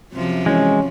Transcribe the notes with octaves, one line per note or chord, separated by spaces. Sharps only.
F#2 C3 F3
E3 G#3 C#4